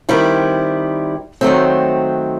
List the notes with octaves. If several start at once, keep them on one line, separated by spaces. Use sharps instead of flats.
D#3 G3 C4 E4
D#3 F#3 A3 C4